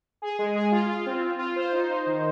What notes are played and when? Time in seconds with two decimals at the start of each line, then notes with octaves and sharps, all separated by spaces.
0.22 G#4
0.39 G#3
0.55 G#4
0.72 F4
0.88 F4
1.06 C4
1.22 F4
1.39 F4
1.56 C5
1.72 D#4
1.90 D#4
2.06 D#3